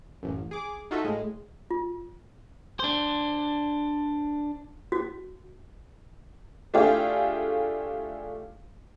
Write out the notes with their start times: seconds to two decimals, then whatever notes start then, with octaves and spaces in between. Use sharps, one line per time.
0.23 A1 F#2
0.51 G#4 D6
0.91 D#4 F4 F#4 A4 E5
1.04 A2 G#3
1.71 F4
2.80 D4 C5
4.92 F#4
6.74 A3 D4 E4 F4 G4 G#4